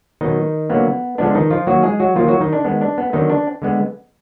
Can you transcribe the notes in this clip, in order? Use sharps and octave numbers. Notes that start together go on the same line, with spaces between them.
B2 D#3 F#3 B3 D#4
D3 F#3 A#3 B3
D3 F3 G#3 B3 D4
D#3 D#4
F3 F4
D#3 F#3 A#3 F#4
G#3 G#4
F#3 F#4
D#3 F3 F#3 A#3 F4
F#3 F#4
D#3 D#4
D4
D#3 G#3 B3
D4
B3
D3 D#3 F#3 B3 D#4
D4
D3 G#3 B3